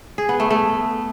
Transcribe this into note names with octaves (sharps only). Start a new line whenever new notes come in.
G#4
B3
A3
A3